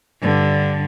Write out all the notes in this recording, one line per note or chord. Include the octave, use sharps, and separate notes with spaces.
G2 D3